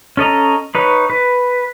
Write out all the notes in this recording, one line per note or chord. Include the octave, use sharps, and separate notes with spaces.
C#4 A4 D#5 A#5
D#4 B4 C#5
B4